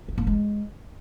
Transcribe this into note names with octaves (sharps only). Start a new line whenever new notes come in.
D#4
A#3
G#3